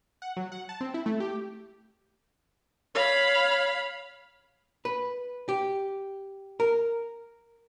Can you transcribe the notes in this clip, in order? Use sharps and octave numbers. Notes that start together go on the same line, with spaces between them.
F#5
F#3
F#5
A5
C4
E4
A3
G4
C#5 F5 B5
B4
G4
A#4